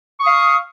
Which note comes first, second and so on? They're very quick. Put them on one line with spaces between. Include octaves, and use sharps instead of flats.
C#6 D#6 F5